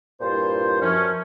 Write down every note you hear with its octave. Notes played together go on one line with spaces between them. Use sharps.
G2 A#2 E4 F4 C5
F#2 F3 C#4